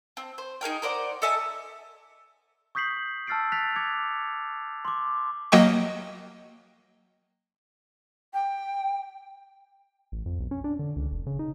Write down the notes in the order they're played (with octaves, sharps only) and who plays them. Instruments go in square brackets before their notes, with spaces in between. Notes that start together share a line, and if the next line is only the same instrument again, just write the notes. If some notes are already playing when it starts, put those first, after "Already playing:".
[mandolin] C4
C5
D#4 G#4 A#4 G5
A#4 C5 D5 F#5
A4 D#5 E5 G#5
[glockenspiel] C#6 D#6 G6 B6 C7 F#7
A5 E6 F6 A6 C7 D7
F#6 A6 B6 F7
D6 G#6 C#7
C6 D6
[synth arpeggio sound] F#3 A#3 D#5 G5 C#6
[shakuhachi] G5
[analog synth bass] A1
F2
B1
C#4
D4
D3
C#2
F1
C#3
D#4